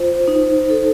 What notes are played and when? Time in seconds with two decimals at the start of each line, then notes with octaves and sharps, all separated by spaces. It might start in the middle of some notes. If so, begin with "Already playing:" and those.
Already playing: F4 C5
0.28 D#4
0.70 A4